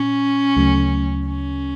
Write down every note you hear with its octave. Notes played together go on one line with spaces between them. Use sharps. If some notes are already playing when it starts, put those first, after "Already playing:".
Already playing: A#2 C#4
D2 C#3 F#3 A3
C#4